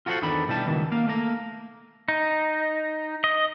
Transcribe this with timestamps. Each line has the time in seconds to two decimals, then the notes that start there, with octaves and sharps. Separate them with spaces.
0.06 F4 F#4 A4 A#4 C5 F#5
0.22 E2 D#3 D4 A4 B5
0.48 B2 G3 E4 A5
0.66 C#2 B2 D#3 E3
0.92 A#3 F5
1.08 A3 A#3 A#4
2.08 D#4
3.24 D#5